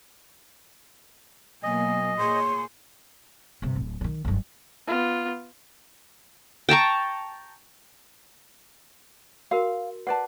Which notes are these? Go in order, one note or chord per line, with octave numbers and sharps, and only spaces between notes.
B2 F#3 A#3 D#5 G#5
A#2 G#4 C#5 C6
G2 C3
D1
D3 D#3
F#1 G2
B3 F4
G5 A5 A#5 C#6
F#4 A#4 F5
B4 D5 F#5 A5